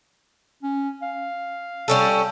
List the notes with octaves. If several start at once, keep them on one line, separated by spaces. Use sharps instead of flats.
C#4
F5
G3 C#4 A4